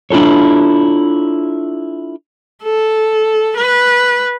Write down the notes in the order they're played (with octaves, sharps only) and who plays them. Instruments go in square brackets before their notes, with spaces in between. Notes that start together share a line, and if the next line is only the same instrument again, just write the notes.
[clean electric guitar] D4 E4 F4 A4 C#5
[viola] A4
B4